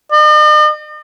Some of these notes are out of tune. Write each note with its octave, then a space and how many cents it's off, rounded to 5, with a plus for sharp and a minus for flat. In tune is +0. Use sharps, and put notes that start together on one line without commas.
D#5 -45